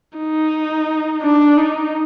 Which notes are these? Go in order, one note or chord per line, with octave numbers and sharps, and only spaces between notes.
D#4
D4
D#4